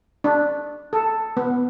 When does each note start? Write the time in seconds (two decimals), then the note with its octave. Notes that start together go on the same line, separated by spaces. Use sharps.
0.24 D4
0.93 A4
1.37 B3